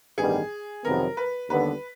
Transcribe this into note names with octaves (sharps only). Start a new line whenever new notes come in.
A1 G2 D#3 G3 B3 G#4
F2 C3 D#3 F#3 B3 A#4
B4
D#2 D3 G3 B3 B4